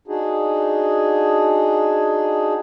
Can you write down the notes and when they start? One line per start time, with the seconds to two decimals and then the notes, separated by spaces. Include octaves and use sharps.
0.08 D4 D#4 F#4 G#4